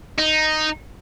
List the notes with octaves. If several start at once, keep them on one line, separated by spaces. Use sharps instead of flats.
D#4